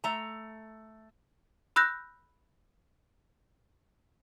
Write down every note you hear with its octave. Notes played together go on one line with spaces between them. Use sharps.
A3 A#5
B5 E6 F#6 G6 A#6